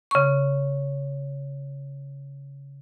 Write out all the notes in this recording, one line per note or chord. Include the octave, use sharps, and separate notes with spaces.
C#3 C#6